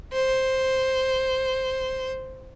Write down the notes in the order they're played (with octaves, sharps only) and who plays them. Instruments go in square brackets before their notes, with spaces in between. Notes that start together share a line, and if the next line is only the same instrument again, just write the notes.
[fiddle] C5